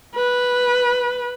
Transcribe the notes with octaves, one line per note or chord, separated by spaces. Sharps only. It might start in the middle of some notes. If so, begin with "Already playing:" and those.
B4